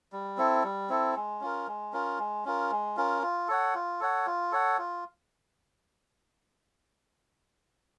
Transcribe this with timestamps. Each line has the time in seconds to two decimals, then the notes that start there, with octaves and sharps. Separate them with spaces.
0.12 G3
0.37 C4 E4 A4
0.64 G3
0.89 C4 E4 A4
1.16 G#3
1.41 C#4 F4 A#4
1.67 G#3
1.93 C#4 F4 A#4
2.18 G#3
2.45 C#4 F4 A#4
2.71 G#3
2.97 C#4 F4 A#4
3.22 F4
3.48 A4 C#5 F#5
3.75 F4
4.00 A4 C#5 F#5
4.26 F4
4.52 A4 C#5 F#5
4.78 F4